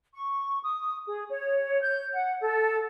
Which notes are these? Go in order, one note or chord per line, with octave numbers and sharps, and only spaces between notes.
C#6
D#6
G#4
C#5
G6
F#5
A4